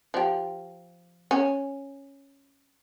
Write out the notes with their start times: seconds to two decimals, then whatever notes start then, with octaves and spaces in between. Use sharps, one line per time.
0.14 F3 G4
1.31 C#4